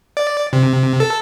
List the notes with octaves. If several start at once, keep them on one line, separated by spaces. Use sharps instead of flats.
D5
C3
A4